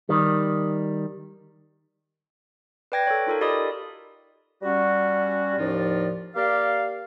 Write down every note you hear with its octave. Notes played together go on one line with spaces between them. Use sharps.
D#3 G3
B4 D5 G5 G#6 A#6
A4 C#5
D#4 F4 A4 A#4
F#4 G4 D5 D#5 B5 D#6
G3 C#4 F#4
D#2 A2 F3 D#4 F4 D5
A#3 G4 D5 F5